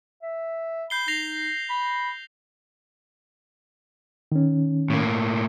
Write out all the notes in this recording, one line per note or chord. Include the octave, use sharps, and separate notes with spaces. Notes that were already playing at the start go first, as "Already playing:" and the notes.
E5
B5 G6 C7 G7
D#4 A#6 C7 F7
B5
D#3 C#4
A2 A#3